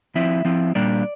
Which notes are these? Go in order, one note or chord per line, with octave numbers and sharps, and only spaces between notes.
F3 C4 E4 E5
F3 C4 E4
A#2 G3 A#3 D4 D5